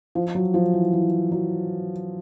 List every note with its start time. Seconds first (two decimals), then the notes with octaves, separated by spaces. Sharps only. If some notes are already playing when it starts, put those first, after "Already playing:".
0.15 F3
0.35 F#3
0.54 F3
0.74 E3
0.93 E3
1.32 F#3